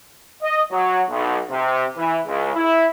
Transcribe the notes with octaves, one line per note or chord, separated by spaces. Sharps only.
D#5
F#3
B1
C3
E3
C#2
E4